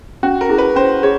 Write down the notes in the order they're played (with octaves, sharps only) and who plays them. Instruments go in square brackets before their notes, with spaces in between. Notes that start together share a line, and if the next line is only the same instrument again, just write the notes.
[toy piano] C#4 [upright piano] F#4
[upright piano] A#4
[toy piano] E4 G#4
[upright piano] B4
[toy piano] C#4 [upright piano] C5
[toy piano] G#4 [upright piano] C#5